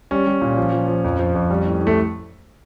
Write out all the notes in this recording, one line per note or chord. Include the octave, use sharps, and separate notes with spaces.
G3 C#4
G3
A#2
F3
F3
F3
F2
F3
F2
G3
A2
A2
A3